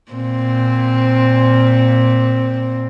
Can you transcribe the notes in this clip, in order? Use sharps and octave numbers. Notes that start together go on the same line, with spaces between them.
A#2 C4